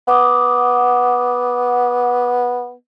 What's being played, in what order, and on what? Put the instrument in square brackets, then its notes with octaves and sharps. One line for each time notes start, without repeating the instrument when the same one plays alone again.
[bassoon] B3 [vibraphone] F#5 D6 D#6